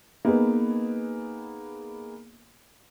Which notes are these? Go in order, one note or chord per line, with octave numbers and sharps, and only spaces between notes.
A#3 B3 D#4 G#4 B4